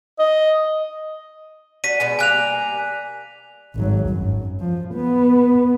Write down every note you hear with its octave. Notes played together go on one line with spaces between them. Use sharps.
D#5
D4 F#4 B6 D#7
B2 G#3 B3
G3 A#3 G#5 F#6 F7
G#1 F#3
F#2
F3
B3